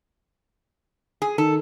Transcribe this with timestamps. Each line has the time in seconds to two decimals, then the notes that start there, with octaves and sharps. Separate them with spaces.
1.22 G#4
1.38 D#3 A4